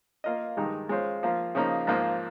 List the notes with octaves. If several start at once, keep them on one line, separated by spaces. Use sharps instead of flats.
A#3 F4 A#4 D#5
G2 D#3 G#3 D#4
G#3 C#4 F4 C5
F3 A#3 F4
C#3 F3 A#3 D#4
G#2 F3 A#3 F4